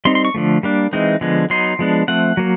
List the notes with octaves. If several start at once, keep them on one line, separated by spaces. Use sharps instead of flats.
G3 C4 D#4 C6
C6
C#6
D3 F3 A3
G3 A#3 D4
E3 G#3 C4 D#4
D3 F3 G#3 B3
F#3 B3 D#4 C6
F3 G#3 B3 D4
F3 A3 C4 F#5
F#3 A#3